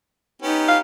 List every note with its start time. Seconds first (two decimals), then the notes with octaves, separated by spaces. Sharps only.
0.42 B3 C#4 D#4 G4
0.68 F5